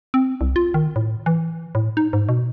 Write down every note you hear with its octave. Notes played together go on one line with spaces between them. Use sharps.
C4
C2
F4
D#3
A2
E3
A2
D#4
G#2
B2